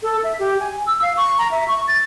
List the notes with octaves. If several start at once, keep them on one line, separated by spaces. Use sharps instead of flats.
A4
E5
G4
G#5
E6
F5
C#6
A#5
E5
C#6
A6